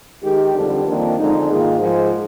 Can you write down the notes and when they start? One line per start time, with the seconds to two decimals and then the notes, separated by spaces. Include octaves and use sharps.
0.23 D#3 G#3 D#4 G4
0.54 F2 D3 G3 D4
0.85 F2 D#3 A#3 D4 F4
1.17 F2 D3 G#3 D#4
1.49 G#2 D#3 A#3 F4 G#4
1.80 G#2 F3 G#3